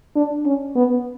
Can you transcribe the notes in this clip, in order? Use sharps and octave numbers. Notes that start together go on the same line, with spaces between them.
D4
C#4
B3